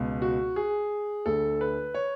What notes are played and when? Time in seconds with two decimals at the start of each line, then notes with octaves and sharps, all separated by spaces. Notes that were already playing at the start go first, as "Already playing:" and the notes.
Already playing: C#2 B2
0.22 F#4
0.56 G#4
1.26 D2 D3 A4
1.61 B4
1.94 C#5